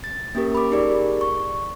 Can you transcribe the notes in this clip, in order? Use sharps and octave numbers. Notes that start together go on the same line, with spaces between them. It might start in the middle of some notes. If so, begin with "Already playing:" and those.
A6
A#3 C#4 G4 A#4
B5 D6
D#4 G4 G#4 A#4 D5
C#6